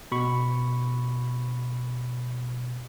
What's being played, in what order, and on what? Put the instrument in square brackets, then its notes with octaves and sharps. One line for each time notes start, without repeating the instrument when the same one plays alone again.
[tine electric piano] B2 B5 C#6